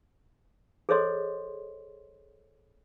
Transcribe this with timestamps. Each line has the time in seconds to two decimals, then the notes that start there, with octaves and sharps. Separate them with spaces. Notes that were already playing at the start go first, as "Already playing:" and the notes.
0.89 G#4 A4 C5 C#5 D#5 C6